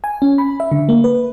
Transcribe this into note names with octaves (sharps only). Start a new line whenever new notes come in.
G#5
C#4
B5
E5
D3
A#3
B4